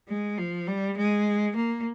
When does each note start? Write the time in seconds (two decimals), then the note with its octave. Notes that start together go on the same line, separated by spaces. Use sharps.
0.09 G#3
0.38 F3
0.67 G3
0.97 G#3
1.56 A#3